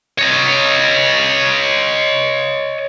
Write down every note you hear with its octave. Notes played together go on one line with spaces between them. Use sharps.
C#5 D#5